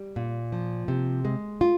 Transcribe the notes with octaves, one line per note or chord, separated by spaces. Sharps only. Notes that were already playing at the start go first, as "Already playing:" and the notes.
Already playing: G3
A#2
F3
C3
G#3
F4